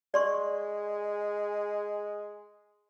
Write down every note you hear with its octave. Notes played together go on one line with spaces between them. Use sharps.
G#3 D5 C6 C#6